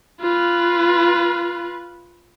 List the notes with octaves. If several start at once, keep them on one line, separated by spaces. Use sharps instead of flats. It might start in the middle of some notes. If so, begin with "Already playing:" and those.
F4 B4